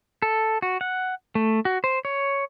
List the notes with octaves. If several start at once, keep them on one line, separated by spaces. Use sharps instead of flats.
A4
F#4
F#5
A3
F#4
C5
C#5